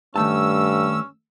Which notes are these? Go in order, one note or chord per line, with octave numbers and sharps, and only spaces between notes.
G2 D#3 A3 C#4 A5 E6